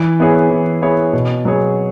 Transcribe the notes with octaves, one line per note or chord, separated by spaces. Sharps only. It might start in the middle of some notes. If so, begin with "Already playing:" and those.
Already playing: E3
B3 E4 G#4 C#5
E3
B3 E4 G#4 C#5
B2
F#3 B3 G#4 C#5